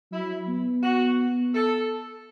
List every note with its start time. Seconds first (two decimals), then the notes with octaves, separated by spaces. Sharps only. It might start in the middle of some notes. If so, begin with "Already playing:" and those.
0.12 F#3 E4
0.48 B3
0.83 F#4
1.54 A4